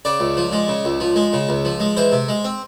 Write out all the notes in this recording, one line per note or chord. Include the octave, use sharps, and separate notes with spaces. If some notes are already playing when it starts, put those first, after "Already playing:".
C#3 D5
C#2
F3
G#3
C#3
C#2
F3
G#3
C#3
C#2
F3
G#3
E3 C5
C3
G#3
C4